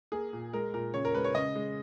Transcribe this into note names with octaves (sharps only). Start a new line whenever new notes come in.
A#3 G#4
A#2
G#3 A#4
A#2 A#4
C#3 C#5
A#4
G#3 B4
C#5
C#3 D#5
G#3